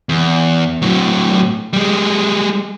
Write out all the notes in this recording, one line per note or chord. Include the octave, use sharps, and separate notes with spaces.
E2
A2 F#3
G3 G#3